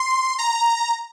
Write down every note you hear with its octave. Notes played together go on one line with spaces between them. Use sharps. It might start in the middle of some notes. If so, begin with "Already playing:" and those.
Already playing: C6
A#5